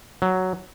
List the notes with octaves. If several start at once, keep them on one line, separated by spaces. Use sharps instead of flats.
F#3